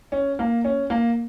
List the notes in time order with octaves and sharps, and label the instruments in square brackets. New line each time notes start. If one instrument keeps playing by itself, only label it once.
[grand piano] C#4
A#3
C#4
A#3